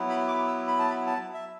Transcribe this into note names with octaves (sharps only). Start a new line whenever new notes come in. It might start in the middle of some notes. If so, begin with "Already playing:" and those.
Already playing: F#3 B3 E4
B5
D6
E6
B5
A5
B5
A5
E5